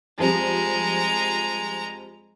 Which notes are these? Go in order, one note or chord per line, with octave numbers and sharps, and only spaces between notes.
F2 F3 G3 G#3 A#5